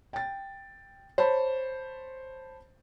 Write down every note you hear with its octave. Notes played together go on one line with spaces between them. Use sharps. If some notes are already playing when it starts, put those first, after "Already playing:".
G5 A6
C5 C#5 A5 B5